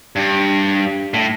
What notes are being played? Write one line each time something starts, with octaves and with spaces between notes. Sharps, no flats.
G2
A2